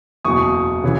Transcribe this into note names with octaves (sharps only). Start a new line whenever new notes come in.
F#1 E2 B2 C#6 D#6
C#3 E3